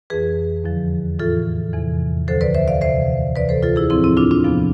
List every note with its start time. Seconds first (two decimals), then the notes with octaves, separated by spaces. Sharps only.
0.10 F2 E3 G#4 B4
0.64 E2 D3 F3
1.19 A2 E3 F4 A4
1.73 E2 C3 E3
2.27 D2 D3 F3 A4 C5
2.41 B4 D5
2.54 C5 E5
2.68 D5 F5
2.81 E2 C3 E3 C5 E5
3.36 D2 C3 E3 B4 D5
3.49 A4 C5
3.63 F4 A4
3.76 E4 G#4
3.90 A2 F3 C4 E4
4.04 C4 E4
4.17 D4 F4
4.31 D4 F4
4.44 E2 C3 F3 B3